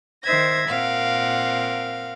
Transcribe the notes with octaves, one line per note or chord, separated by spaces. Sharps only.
D#3 C5 E5 G#6 A#6
A#2 C4 A#4 F5 F#5